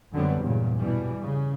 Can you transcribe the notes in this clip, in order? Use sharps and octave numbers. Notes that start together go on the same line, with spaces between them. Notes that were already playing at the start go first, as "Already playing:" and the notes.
F#2 D3 F#3 G3 B3 C4
E2 G2 A#2 C#3
B2 E3 G3
C#3